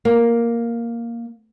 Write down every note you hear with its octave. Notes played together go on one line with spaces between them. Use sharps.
A#3